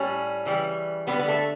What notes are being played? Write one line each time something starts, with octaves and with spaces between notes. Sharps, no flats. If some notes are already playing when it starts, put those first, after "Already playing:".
Already playing: A2 G3 C#4
C#3 E3 G3
D3 G3 B3
B3
A3